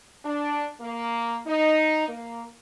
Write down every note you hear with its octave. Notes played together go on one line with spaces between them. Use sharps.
D4
A#3
D#4
A#3